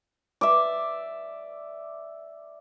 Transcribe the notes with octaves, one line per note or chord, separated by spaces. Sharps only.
D5 E5